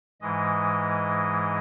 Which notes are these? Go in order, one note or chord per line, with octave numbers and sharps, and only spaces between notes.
G#2 E3 G#3 D#5